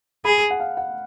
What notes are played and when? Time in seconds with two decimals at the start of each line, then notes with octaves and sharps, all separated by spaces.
0.25 G#4 B5
0.50 F#5
0.60 F5
0.77 F#5